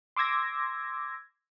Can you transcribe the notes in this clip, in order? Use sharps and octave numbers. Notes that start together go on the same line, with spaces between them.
C6 D6 E6 G#6 A#6